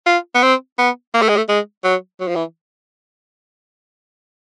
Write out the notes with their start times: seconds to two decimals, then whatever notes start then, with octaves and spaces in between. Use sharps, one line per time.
0.06 F4
0.35 B3
0.43 C4
0.78 B3
1.14 A#3
1.22 A3
1.29 G#3
1.37 A3
1.48 G#3
1.84 F#3
2.20 F#3
2.28 F3
2.35 E3